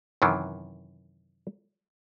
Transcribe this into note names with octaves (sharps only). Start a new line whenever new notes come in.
F#2 C3 D#3 E3